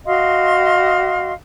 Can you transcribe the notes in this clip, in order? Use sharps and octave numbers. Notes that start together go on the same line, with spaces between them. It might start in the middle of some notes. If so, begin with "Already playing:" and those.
F#4 D#5 F5 C6